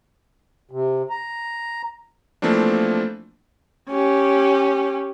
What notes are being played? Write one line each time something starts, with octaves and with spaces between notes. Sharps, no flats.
C3
A#5
E3 F3 A3 A#3 C4 D4
C#4 G4